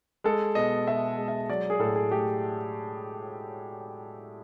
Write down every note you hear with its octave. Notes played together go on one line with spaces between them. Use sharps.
G#3 A4
B2 D#5
B2 E5
G#3
E5
F#3 D5
G#4
A2 A4
G#4
A3 G4